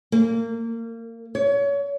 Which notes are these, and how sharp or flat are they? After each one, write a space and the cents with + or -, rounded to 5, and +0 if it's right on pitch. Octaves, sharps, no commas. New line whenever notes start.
A#3 -30
C#5 +30